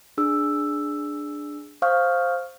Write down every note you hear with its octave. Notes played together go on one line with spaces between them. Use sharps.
D4 G#4 E6
C5 F5 C#6 D#6 F6 G6